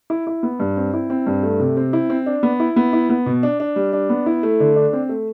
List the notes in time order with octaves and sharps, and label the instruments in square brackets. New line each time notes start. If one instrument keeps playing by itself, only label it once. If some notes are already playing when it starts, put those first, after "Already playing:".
[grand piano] E4
E4
B3
G2
C4
E4
C4
G2
A3
C3
C4
E4
C4
D4
B3
E4
B3
E4
B3
B2
D4
D4
G3
D4
B3
E4
A3
D3
D4
C4
A3